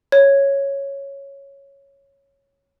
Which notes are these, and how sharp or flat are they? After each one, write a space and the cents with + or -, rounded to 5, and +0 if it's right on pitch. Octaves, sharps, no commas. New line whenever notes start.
C#5 -5